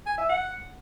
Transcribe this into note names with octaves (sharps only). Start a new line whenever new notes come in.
G#5
E5
F#5